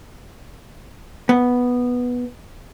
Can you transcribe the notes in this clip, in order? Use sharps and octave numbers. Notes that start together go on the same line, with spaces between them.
B3